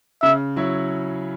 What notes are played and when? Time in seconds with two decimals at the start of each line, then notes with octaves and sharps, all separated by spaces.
0.22 C#3 E5
0.56 F#3 E4 C#5